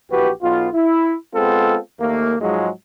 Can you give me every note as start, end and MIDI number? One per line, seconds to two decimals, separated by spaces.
0.10 0.30 34
0.10 0.30 52
0.10 0.30 66
0.10 0.30 67
0.10 0.30 71
0.42 0.67 35
0.42 0.67 59
0.42 0.67 65
0.73 1.14 64
1.34 1.77 56
1.34 1.77 59
1.34 1.77 60
1.34 1.77 65
1.34 1.77 69
1.99 2.34 39
1.99 2.34 57
1.99 2.34 58
2.40 2.68 44
2.40 2.68 53
2.40 2.68 54
2.40 2.68 56